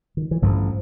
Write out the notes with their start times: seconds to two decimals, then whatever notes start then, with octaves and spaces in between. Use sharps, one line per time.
0.17 D#3
0.31 E3
0.42 A1 G2 D3 F3